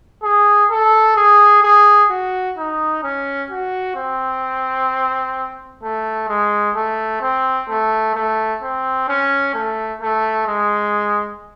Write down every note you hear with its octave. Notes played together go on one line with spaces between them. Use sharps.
G#4
A4
G#4
G#4
F#4
D#4
C#4
F#4
C4
A3
G#3
A3
C4
A3
A3
C4
C#4
A3
A3
G#3